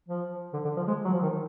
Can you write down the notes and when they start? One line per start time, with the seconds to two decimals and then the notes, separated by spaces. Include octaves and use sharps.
0.08 F3
0.53 D3
0.65 D3
0.76 F3
0.87 G#3
1.05 F#3
1.13 F3
1.22 D#3